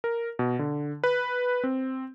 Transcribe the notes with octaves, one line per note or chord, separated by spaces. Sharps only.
A#4
B2
D3
B4
C4